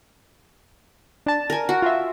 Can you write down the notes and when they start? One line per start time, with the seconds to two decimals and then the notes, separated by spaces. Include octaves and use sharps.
1.26 D4 A5
1.50 A#4 G#5
1.69 F#4
1.82 F4 E5